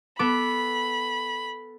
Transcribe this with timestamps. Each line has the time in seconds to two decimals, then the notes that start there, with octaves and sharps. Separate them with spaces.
0.19 B3 A4 B5 D6